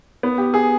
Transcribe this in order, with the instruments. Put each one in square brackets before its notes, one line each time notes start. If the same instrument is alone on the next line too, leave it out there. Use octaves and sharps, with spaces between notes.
[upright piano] B3
G4
G#4